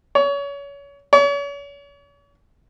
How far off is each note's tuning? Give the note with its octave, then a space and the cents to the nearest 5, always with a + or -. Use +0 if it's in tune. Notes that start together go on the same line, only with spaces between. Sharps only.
C#5 +30
C#5 +40